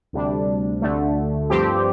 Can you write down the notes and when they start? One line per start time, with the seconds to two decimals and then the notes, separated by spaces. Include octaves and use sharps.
0.13 D2 C3 G3 D4
0.82 D2 D3 A3
1.50 G2 F3 C4 G4